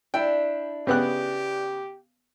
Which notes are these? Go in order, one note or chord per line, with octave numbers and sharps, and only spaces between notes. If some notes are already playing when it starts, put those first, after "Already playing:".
D4 E4 G5
C#3 B3 G4 F#6